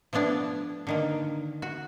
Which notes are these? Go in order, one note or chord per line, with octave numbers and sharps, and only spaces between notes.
F3 A3 B3 D4 E4
D3 D#3 A#3
F#4